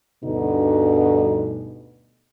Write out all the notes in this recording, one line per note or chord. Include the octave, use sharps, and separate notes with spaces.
D2 G2 B2 D3 D4 D#4